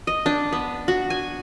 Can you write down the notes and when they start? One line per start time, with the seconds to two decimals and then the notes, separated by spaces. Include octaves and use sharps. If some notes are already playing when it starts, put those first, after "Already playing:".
0.07 D#5
0.26 D4
0.52 B3
0.88 F#4
1.10 G#5